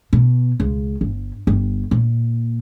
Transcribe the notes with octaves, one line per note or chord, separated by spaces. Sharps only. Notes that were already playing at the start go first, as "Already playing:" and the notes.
B2
C#2
G1
G1
A#2